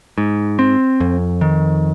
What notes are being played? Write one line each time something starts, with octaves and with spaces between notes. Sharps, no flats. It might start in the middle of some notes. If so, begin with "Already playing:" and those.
G#2
C4
F2
D#3